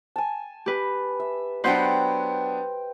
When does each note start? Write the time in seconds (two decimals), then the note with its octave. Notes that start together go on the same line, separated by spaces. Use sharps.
0.16 G#5 A5
0.66 G4 B4
1.20 E5
1.64 F#3 B3 D4 B4 C5 G5 E6 G6